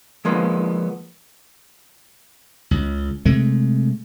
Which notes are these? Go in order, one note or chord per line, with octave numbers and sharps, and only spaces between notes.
F3 G#3 A#3 B3 F4
C#2
C3 G#3 A3